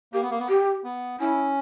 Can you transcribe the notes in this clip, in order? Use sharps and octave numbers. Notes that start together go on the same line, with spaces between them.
A#3 G4
B3
A#3
B3
G4
B3
C#4 E4